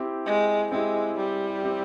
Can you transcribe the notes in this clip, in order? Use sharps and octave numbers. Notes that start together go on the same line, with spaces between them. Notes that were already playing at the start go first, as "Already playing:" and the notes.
Already playing: C4 E4 G4
G#3
G#3 C4 E4 G4
G3
C4 E4 G4